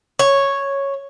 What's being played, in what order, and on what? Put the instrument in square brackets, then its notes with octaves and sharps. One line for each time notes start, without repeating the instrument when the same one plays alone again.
[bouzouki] C#5